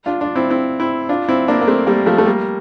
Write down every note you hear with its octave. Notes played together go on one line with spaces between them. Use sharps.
D4 F4
D4 F4
C4 E4
C4 E4
C4 E4
D4 F4
C4 E4
A#3 D4
A#3
A3 C4
G3 A#3
F3 A3
A3
G3 A#3